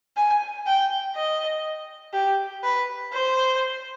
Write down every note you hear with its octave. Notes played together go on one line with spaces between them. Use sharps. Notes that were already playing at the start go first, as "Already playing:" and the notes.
G#5
G5
D#5
G4
B4
C5